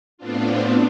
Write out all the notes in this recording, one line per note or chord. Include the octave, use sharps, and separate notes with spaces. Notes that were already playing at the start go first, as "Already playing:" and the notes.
A2 B3 C4 D4 F4